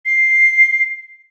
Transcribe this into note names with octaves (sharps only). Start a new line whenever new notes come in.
C7